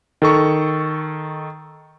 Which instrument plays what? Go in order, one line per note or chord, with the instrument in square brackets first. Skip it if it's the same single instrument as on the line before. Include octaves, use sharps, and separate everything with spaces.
[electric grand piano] D#3 A4 C#6